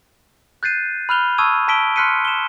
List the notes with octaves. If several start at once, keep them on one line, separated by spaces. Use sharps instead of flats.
F#6 G6 A6 C7 D#7
B5 F6 F#6 F7 G7
A5 C#6 D#6 E6 G#6 D#7
A5 E6 B6 D7 D#7 G7
C6 F6 F#6 B6 C#7 D#7
E7 G7